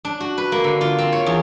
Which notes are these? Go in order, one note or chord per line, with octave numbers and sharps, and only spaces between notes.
D4
F#4
B4
A#3
D3
F4
C4
C#5
E2